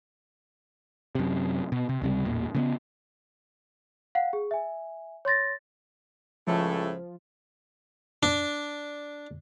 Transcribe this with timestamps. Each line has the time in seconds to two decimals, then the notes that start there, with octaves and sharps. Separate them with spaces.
1.15 F#2 C3
1.72 B2
1.89 C3
2.02 C#2 C3 G3
2.25 A1 E2 A#2
2.55 C#3 A3 B3
4.15 F5 F#5
4.33 G#4
4.51 E5 G#5
5.25 C#5 C6 A6 A#6
6.47 C#2 A2 F3 A3
8.23 D4